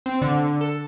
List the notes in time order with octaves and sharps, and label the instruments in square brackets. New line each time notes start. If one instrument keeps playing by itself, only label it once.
[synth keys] C4
D3
A4